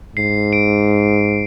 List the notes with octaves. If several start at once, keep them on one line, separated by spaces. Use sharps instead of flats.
G#2 C7
D7